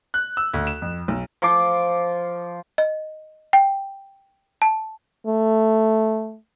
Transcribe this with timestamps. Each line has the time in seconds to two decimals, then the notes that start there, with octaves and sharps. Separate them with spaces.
0.14 F#6
0.37 E6
0.54 D2
0.67 E7
0.82 F2
1.08 B1
1.42 F3 C6 D6
2.78 D#5
3.53 G5
4.62 A5
5.27 A3